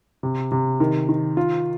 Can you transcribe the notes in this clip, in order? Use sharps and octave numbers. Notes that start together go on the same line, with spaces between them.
C3
C3
D#3
D#3
F4